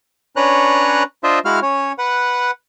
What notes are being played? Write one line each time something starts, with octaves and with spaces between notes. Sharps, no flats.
C#4 D4 B4 C#5 A#5 F#6
D4 F4 C5 D#5 E5
G#3 E4 F#4 F5 F6
C#4 C#5
B4 F#5